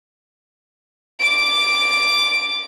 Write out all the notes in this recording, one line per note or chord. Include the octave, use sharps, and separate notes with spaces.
D6 D7